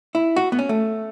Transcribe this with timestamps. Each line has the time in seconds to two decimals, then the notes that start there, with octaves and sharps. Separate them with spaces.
0.15 E4
0.36 F#4
0.52 B3
0.59 C#4
0.69 A3